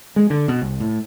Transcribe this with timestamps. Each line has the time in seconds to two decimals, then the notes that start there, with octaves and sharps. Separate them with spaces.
0.16 G#3
0.30 D3
0.48 B2
0.62 C2
0.80 A2